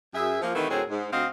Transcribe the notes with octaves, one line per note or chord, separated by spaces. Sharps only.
F#2 G#4 E5
F3 A#3
C3 D#3 E3 A3 B3 D#4
D2 A2 F#3 C4 G#4 A#4
G#2
D2 C4 F#4 D#5 F5